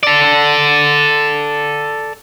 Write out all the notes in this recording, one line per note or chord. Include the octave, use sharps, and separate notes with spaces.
A4 D5